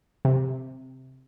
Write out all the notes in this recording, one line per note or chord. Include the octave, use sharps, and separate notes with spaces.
C3